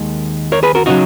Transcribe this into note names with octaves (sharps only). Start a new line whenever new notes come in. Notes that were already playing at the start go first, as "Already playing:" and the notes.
Already playing: D#2 D#3 G#3
A#4 C#5
G#4 B4
F#4 A#4
C#3 F#3 D#4 F#4